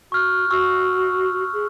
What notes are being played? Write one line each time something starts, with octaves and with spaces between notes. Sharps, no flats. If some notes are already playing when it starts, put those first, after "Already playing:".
F#4 C#6 F6 F#6
F#4 C#6 E6
G#4